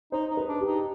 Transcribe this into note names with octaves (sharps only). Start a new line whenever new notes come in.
D#4 C5
D#4
B4
D4
G4
D#4